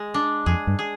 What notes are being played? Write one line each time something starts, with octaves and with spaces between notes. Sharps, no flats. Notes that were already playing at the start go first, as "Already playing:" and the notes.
Already playing: G#3
D4
F2 G#4
G2
G#4